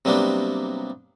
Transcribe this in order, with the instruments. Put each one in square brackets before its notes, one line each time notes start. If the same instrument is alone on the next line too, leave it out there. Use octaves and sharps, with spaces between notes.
[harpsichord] C3 F#3 G3 A#3 B3 D4